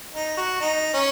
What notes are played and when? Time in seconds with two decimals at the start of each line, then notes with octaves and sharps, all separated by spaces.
0.14 D#4
0.37 F#4
0.61 D#4
0.94 C#4